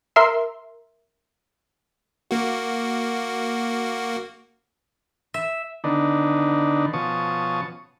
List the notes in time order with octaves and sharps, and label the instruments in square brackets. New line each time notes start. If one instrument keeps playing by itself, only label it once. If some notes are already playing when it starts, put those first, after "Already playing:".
[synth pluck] A#4 E5 C6
[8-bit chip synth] A#3 F#4
[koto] E5
[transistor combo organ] D3 D#3 B3 D4 D#4
B2 F3 C#4 A5 C#6 D#6